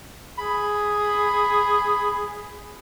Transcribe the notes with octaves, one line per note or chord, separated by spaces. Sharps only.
G#4 B5